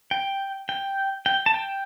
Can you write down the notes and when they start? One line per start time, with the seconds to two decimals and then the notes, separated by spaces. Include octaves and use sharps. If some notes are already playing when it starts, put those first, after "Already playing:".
0.11 G5
0.69 G5
1.26 G5
1.46 A5
1.54 G5